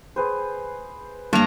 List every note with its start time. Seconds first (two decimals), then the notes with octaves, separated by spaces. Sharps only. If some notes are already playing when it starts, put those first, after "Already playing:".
0.16 G#4 B4 C5
1.33 G2 A#3 A#5